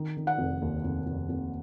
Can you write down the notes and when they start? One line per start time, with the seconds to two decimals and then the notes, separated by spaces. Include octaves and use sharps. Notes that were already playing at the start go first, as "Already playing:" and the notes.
Already playing: D#3
0.17 D#3
0.27 F#5
0.38 F1
0.62 D#2
0.84 F1
1.06 F1
1.29 F1